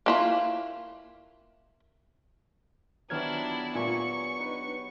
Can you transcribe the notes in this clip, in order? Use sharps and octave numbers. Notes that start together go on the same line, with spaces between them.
A#3 E4 F4
D#3 F#3 B3 D4 E4 G4 F6 G#6
A#2 G#5 C#6
D4 D#4 B4